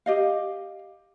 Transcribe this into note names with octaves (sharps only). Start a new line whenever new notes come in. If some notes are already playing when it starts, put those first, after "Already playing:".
G4 D#5 F5